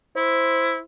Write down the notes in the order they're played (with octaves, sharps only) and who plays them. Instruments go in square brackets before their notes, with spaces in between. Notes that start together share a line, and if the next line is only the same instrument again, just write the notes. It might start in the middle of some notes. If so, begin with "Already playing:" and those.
[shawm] E4 [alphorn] C5